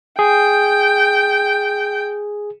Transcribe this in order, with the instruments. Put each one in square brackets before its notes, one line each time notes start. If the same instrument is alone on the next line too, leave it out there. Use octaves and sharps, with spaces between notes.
[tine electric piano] G#4 [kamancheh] G5